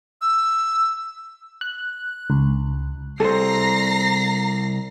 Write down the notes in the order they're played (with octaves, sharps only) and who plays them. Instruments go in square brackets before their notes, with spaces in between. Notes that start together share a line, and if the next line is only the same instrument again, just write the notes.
[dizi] E6
[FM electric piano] F#6
C#2
[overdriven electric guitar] C2 [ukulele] A4 C5 [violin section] A#5 A#6 C7